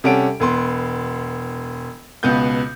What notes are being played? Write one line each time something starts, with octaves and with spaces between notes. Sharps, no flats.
C3 G3 C#4 A4 F#5 D7
E1 B3 C6
C#2 B2 B3 G6